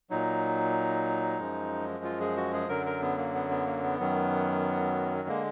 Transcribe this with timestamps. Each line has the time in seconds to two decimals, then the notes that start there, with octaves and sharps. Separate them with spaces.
0.10 A#2 F#3 D#4
1.39 F#2 F3 G#3
2.04 F4
2.21 G#4
2.37 F#4
2.53 G#4
2.69 F#2 D3 F#3 A#4
2.86 A#4
3.02 B3
3.18 A#3
3.34 B3
3.50 B3
3.66 A#3
3.83 B3
3.99 F#2 D#3 F#3
5.28 D3 G#3 A#3